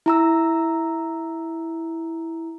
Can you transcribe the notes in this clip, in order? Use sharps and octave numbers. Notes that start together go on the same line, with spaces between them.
E4 A#5 E6